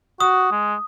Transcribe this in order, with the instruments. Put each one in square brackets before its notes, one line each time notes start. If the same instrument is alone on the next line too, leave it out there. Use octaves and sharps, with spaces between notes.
[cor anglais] F#4 [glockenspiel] D#6
[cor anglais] G#3